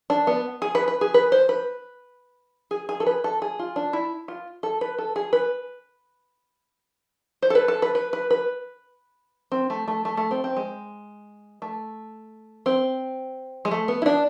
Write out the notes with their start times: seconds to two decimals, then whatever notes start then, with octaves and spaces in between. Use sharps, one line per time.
0.10 D4
0.27 B3
0.62 G#4
0.75 B4
0.88 B4
1.01 G#4
1.14 B4
1.32 C5
1.49 B4
2.71 G#4
2.89 G#4
3.00 A4
3.06 B4
3.24 A4
3.42 G#4
3.59 F4
3.76 D4
3.93 E4
4.28 F4
4.63 A4
4.81 B4
4.98 A4
5.16 G#4
5.33 B4
7.42 C5
7.50 A4
7.55 B4
7.68 A4
7.82 B4
7.95 B4
8.13 B4
8.30 B4
9.52 C4
9.70 A3
9.88 A3
10.05 A3
10.17 A3
10.31 C4
10.44 C4
10.56 G#3
11.62 A3
12.66 C4
13.65 G#3
13.71 A3
13.88 B3
14.02 E4
14.06 D4